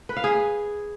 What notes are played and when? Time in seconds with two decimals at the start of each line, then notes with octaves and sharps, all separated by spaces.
0.09 B4
0.16 F5
0.24 G#4